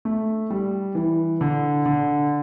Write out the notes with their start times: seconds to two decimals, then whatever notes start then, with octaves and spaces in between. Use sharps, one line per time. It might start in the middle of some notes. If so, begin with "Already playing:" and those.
0.05 A3
0.50 G3
0.95 E3
1.41 D3
1.86 D3